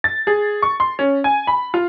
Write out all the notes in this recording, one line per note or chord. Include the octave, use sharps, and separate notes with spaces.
A6
G#4
C#6
C6
C#4
G#5
B5
F4